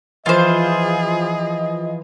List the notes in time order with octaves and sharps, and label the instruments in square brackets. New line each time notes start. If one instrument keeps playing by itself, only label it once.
[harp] E3 F3 [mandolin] F4 C5 [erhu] G#4 [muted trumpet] D#5